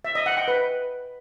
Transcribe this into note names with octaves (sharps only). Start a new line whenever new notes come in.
E5
D#5
F#5
G5
B4